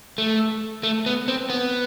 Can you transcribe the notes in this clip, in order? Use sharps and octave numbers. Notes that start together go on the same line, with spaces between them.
A3
A3
B3
C4
B3